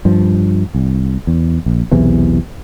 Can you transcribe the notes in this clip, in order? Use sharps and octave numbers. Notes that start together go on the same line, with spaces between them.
G2 F3
C2
E2
A#1
B1 E2 C3 E3